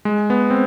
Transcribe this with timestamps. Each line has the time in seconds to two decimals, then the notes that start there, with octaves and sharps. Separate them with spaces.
0.05 G#3
0.30 B3
0.50 C4